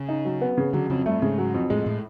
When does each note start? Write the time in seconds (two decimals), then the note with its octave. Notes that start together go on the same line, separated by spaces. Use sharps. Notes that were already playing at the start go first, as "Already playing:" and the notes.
Already playing: C#3 C#4
0.09 D#4
0.25 F#3
0.41 B3
0.58 C#3
0.73 D3 F#3 D4
0.90 F2 C#3 C#4
1.06 G2 G3 A3
1.22 G#2 C#3 G#3
1.38 F#3
1.54 F2
1.70 A2 G#3 A3
1.86 A2 A3